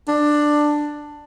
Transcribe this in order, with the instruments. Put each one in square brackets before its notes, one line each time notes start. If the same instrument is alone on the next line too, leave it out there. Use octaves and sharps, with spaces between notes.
[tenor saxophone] D4